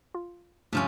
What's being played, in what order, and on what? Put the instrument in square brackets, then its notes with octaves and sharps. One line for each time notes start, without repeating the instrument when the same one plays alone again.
[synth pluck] F4
[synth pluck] D2 G2 F6 [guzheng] C3 F3 C#4